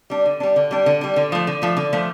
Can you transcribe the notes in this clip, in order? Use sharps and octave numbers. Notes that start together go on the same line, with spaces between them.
G3 D4
D3
G3 D4
D3
G3 D4
D3
G3 D4
D3
F3 A3
D3
F3 A3
D3
F3 A3